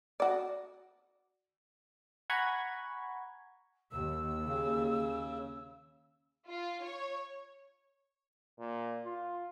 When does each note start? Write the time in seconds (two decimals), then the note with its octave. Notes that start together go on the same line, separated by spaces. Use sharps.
0.20 F#4 D5
2.30 F#5 G#5 A#5 B5 C#6 G#6
3.91 D#2 E6
4.45 C#3
6.49 F4
6.83 C#5
8.58 A#2
9.04 F4